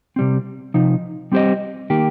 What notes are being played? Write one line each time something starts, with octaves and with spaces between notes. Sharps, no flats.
C3 G3 C4
C3 F3 D#4
G3 C4 G4 C5 D#5
D#3 A#3 G4